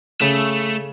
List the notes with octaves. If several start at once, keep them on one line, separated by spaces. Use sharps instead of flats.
C#3 A3